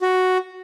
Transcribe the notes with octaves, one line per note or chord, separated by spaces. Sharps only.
F#4